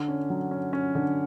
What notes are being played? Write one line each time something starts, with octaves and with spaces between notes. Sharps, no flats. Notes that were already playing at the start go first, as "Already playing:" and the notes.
Already playing: D3
C#4
F#3
C#4
C#4
D3